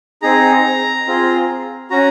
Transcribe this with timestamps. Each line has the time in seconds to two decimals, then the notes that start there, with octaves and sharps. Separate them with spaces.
0.22 C4 D#4 G#4 A#5
1.07 C4 F4 G#4
1.90 C#4 F#4 A#5